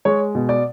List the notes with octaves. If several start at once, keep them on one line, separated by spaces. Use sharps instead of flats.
G#3 C#5
B2
D5